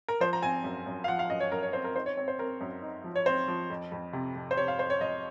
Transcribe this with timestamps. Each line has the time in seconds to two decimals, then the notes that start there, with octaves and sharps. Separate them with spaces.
0.08 A#4
0.20 F3 C5
0.33 A#5
0.42 C4 G#5
0.64 F#2
0.86 F#2
1.04 F5
1.08 F3 F#5
1.19 F5
1.30 F#2 D#5
1.40 C#5
1.51 F#2 A#4
1.63 C#5
1.73 C4 C5
1.84 A#4
1.95 D#4 C5
2.06 C#5
2.17 C4 C#5
2.28 C5
2.39 C4 A#4
2.61 F#2
2.82 D#4
3.04 F3
3.15 C#5
3.26 C4 C5
3.48 F3
3.70 F2
3.92 F2
4.13 C3
4.35 F2
4.51 C5
4.57 C3 C#5
4.68 F5
4.79 F2 C5
4.90 C#5
5.01 F2 D#5